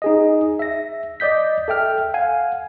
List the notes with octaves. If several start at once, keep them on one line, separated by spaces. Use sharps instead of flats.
D#4 G#4 D#5
E5 A#6
D5 D#5 G6 B6
A4 E5 G5 F6
F5 F#5 G#5